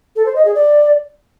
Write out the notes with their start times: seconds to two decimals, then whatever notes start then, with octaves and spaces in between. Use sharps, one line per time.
0.16 A4
0.26 C5
0.36 D#5
0.45 G#4
0.55 D5